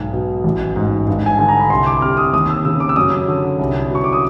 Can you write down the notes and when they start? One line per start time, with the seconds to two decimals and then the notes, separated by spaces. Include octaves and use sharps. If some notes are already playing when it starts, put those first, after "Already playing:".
Already playing: B1 G#2
0.13 B2
0.44 A1
0.76 G#2
1.07 G2
1.26 G#5
1.37 D3 A5
1.49 A#5
1.59 B5
1.70 C2 C6
1.86 D6
2.01 C3 F6
2.17 D#6
2.33 D#2 D#6
2.50 E6
2.65 C#3 E6
2.80 D6
2.89 E6
2.96 F#2 D#6
3.28 D3
3.59 C2
3.90 B2 C#6
4.04 D6
4.13 D#6